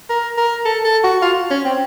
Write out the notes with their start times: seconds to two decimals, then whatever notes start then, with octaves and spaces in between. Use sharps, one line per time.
0.10 A#4
0.38 A#4
0.65 A4
0.85 A4
1.04 F#4
1.22 F4
1.51 C#4
1.65 C4